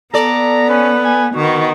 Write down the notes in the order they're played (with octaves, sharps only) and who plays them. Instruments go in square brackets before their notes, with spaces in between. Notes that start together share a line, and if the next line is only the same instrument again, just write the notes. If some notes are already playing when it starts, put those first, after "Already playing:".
[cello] B3 [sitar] A4 D5 [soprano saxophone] A#5
[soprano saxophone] C#4 [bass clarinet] B4
[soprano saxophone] G#5
[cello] D#3 [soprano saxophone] B3 [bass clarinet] F#4